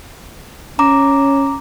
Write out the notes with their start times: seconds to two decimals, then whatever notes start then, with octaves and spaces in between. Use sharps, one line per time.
0.79 C#4 A#5 D6